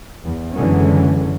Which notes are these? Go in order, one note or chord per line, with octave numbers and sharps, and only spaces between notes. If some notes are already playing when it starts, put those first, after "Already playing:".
E2
F#1 D3 E3 F#3 G#3 C#4